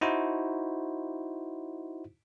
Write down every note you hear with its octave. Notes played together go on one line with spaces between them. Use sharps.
D#4 E4 F#4 C5